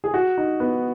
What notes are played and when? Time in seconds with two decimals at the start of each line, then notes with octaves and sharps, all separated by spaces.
0.04 G#4
0.14 F#4
0.38 D#4
0.60 B3